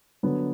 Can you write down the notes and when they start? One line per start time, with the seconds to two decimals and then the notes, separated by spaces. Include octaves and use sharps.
0.23 D3 F#3 B3